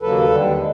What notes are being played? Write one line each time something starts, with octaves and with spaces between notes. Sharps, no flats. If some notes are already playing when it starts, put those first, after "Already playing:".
D#2 C#3 F#3 A#3 A4 B4
D#2 D3 G3
G#3